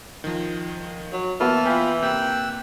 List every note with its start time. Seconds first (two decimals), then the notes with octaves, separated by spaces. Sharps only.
0.24 D#3 F3
1.12 F#3
1.40 E3 A#3 B3 F#4 A5 F6
1.65 B3 F4 G5 G#5 B5
2.02 C3 A#3 G5 E6 F#6